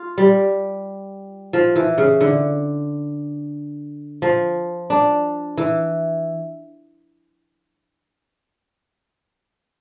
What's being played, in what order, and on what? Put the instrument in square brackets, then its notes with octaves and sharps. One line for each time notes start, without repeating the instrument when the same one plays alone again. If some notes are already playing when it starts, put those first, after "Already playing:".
Already playing: [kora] F4
G3
F3
E3
C#3
D3
F3
D4
E3